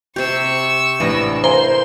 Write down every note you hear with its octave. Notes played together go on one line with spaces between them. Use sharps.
C3 G4 C#6 E6
A1 E3 D4 A#6
A#4 C5 F5 G#5